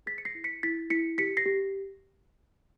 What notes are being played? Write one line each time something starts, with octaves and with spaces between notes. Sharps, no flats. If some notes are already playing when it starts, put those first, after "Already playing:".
G#4 A6 B6
C#7
A#6 C7
E4
B6 C#7
E4 A6 B6
E4 B6 C#7
G4 B6 C#7
A#6 C7
G4